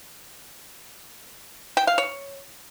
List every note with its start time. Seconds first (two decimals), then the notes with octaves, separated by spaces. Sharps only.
1.77 G5
1.87 F5
1.98 C#5